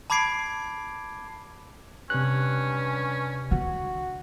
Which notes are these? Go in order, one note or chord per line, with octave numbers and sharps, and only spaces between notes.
A5 B5 D6 G#6 C7 D7
G2 C3 C#4 F#6
D3 F#4